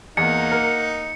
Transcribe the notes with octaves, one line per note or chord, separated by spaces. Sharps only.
E2 A#3 D#4 F#5 C#7
A#4